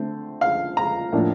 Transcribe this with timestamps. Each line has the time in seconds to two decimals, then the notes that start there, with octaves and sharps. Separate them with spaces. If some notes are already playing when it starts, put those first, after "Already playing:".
Already playing: D3 A3 C4
0.41 F5
0.77 A#5
1.12 A2 F3 A#3 D4